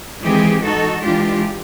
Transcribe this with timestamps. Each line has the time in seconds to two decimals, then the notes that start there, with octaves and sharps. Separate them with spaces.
0.22 D#3 E3 G#3 C4 G4 G#4
0.64 D#4 F#4 A4
1.04 E3 G#3 D4 F4 G4